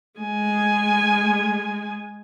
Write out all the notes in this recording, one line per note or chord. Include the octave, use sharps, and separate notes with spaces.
G#3 G#5